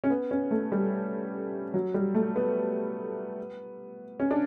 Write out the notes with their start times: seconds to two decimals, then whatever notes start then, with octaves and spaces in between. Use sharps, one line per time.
0.04 C#4
0.10 B3
0.31 C#4
0.51 A3
0.72 G3
1.74 F#3
1.94 G3
2.15 A3
2.36 B3
4.20 C#4
4.31 D4